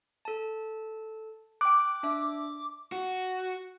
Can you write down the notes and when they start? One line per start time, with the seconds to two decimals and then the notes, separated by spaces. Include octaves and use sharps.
0.25 A4 A5
1.61 G5 D6 F#6
2.03 D4 E5
2.92 F#4